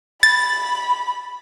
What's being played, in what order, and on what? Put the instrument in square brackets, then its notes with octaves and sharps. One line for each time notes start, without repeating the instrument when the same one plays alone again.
[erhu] B5 [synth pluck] A6